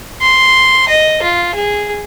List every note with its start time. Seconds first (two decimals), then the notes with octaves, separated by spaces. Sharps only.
0.21 C6
0.88 D#5
1.22 F4
1.55 G#4